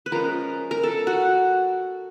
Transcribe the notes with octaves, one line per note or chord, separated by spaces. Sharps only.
B4
F3 G#3 C#4 A#4
A#4
A4
F#4